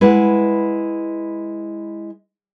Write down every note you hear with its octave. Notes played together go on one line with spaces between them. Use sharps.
G#3 E4 B4 F#5